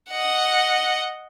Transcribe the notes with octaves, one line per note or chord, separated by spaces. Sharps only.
D#5 F#5